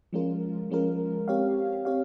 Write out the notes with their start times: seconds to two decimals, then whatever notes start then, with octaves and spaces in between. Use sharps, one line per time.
0.13 F3 G#3 C#4 F4 A#4
0.70 F3 G#3 C#4 F4 A#4
1.28 C4 G4 C#5 F5
1.85 C4 G4 C#5 F5